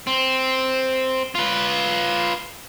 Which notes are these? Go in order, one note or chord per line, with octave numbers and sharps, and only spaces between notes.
C4
F4 B4